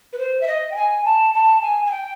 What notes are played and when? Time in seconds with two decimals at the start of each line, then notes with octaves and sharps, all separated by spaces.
0.13 B4
0.18 C5
0.41 E5
0.48 D#5
0.71 G5
0.76 G#5
1.05 A5
1.34 A5
1.62 G#5
1.85 G#5
1.92 G5